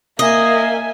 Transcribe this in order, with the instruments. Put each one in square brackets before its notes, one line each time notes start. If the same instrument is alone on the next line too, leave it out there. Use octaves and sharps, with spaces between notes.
[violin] A#3 [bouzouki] D#5 [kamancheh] E5 G#5